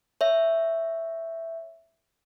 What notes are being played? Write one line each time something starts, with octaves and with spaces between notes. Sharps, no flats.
C#5 E5